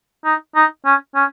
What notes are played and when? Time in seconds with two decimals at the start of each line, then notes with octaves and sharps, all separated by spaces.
0.25 D#4
0.55 D#4
0.85 C#4
1.15 C#4